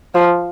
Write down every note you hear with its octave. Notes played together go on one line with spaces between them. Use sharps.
F3